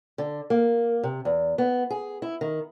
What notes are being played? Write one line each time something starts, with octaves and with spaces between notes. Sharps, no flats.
D3
A#3
C3
E2
B3
G#4
E4
D#3